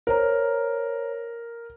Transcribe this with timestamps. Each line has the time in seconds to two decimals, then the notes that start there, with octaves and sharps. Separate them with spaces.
0.07 A#4 C5 C#5 A#5